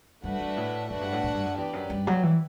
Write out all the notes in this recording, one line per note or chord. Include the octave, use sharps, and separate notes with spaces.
G2 A3 D4 F#4 B4 F#5
G2
A2
F#2 A3 D4 F#4 B4 F#5
G2
A2
A2
G2
F#2
E2 G4 B4 D5
F#2
G2
F#3
E3